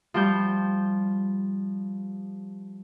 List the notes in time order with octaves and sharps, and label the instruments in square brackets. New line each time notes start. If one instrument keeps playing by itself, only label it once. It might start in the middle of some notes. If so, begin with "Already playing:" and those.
[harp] F3 G3 G6